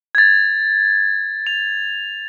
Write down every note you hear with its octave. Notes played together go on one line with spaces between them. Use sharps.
G#6 A6
F7